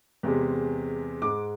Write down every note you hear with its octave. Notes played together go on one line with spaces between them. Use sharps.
E2 C3 G#3
G#2 G#3 D6